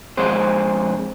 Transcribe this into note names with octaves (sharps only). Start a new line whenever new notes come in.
F2 F3 G#3 C4 C5